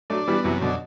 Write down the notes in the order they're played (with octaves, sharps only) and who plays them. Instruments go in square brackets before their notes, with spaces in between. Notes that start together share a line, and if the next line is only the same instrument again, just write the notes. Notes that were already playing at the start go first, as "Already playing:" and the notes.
[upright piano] F#3 A3 [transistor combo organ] D4
[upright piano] E3 G3 [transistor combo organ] B3
[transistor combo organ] F#2 [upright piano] C3 E3
[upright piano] B2 D3 [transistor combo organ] D4